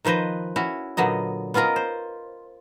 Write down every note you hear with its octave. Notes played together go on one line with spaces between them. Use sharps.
D#3 F3 B4 C5 D#5
C#4 E4 F#4
A#2 D3 F#3 B3 D#5
B3 C#4 F4 A#4 D#5
C5